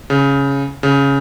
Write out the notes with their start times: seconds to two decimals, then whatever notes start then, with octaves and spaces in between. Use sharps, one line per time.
0.10 C#3
0.83 C#3